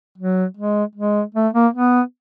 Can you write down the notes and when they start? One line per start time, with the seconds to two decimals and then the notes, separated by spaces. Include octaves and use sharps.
0.18 F#3
0.57 G#3
0.95 G#3
1.35 A3
1.53 A#3
1.74 B3